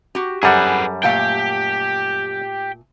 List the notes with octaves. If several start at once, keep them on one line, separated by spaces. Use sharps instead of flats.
F#4 G4
F#2 G3 G#4 A4 B4 F#5
A#2 A3 G4 F5 G5